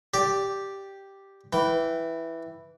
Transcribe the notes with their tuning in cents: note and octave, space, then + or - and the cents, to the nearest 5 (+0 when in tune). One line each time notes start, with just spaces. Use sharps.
G4 +0 D5 +0
E3 +0 G5 -15